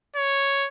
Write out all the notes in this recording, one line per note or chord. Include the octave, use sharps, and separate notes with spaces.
C#5